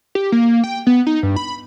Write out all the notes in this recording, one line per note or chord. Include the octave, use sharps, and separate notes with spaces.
G4
A#3
G5
B3
D#4
G2
B5